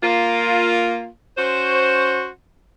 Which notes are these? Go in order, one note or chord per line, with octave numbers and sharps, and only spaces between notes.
A#3 F4
C#4 F#4 C5